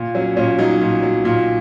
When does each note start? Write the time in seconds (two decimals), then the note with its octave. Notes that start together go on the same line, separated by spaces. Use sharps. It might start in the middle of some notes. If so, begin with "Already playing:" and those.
Already playing: A#2
0.15 F#3 C#4
0.37 A#2 C#4
0.59 F#3 D#4
0.81 A#2
1.03 F#3
1.25 A#2